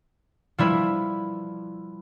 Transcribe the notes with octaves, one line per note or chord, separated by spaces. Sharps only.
F3 G3 E4 B4